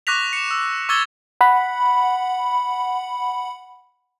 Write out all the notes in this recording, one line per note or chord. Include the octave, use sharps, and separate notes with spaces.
C#6 D6 F#6 A#6 B6 F7
C#7 E7
E6
C#6 D6 E6 G#6 A6 G7
F#5 B5